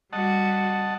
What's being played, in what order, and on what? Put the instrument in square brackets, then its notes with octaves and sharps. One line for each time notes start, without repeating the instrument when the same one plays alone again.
[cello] G3 F#4 [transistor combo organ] D#5 F#5 A5